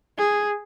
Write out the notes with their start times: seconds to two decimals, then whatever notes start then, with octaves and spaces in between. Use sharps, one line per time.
0.18 G#4